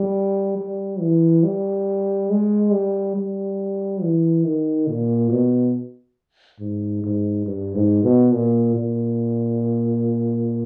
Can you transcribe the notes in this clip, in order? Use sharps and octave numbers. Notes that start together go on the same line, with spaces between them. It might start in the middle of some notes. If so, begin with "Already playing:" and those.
Already playing: G3
G3
E3
G3
G#3
G3
G3
E3
D#3
A#2
B2
G#2
G#2
G2
G#2
B2
A#2
A#2